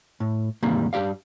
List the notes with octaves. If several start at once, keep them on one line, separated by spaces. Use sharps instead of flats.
A2
E2 G#2 C3 D#3 G3 A#3
G2 C#3 G4 D5 F5